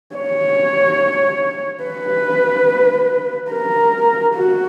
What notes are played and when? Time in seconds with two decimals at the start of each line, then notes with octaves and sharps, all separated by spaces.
0.16 C#5
1.84 B4
3.52 A#4
4.35 F#4